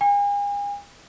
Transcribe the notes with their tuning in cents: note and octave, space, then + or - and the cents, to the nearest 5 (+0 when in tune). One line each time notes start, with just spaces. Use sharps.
G#5 -40